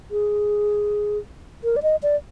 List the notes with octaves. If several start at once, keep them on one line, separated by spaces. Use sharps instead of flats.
G#4
A#4
D5
D#5
D5